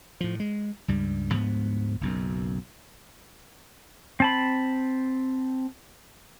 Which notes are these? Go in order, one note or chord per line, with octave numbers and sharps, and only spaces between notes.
A2 F3
G#3
C#2 G2 G3
D2 G#2 F3 B3
F#1 B1 F#2
C4 A5 B5